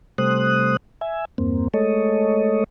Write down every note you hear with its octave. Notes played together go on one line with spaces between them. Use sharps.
C3 G3 A3 C5 D#6 F#6
E5 G#5
E2 G2 A#3 C4
G#3 A3 A4 C#5 D#5